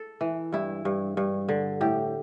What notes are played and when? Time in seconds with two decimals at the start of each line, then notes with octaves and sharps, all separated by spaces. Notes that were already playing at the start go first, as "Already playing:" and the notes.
Already playing: A4
0.21 E3
0.53 G2 E4
0.85 G2
1.17 G2
1.49 D3
1.81 A2 G4